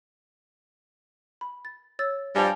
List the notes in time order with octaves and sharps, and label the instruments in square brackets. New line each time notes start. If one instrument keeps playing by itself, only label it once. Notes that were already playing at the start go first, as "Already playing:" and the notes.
[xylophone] B5
A6
C#5 E6 A6
[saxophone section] G2 F3 G3 [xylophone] G#5 A5 F7